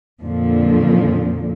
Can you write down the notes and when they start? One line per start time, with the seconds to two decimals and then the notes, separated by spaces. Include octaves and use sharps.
0.23 F2 A#2 D3 F3